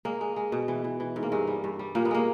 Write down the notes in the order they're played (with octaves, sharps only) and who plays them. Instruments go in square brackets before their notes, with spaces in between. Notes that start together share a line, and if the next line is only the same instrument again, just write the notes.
[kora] G#3 A#3
G#3
G#3
B2
E3
E3
E3
G#2
A#3
G2 G#3
G3
G2
G3
A#2 A#3
B3
G#3 A#3